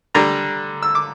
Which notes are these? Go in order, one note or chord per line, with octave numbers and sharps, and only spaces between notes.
D3 G3 D4 A#5
E6
D6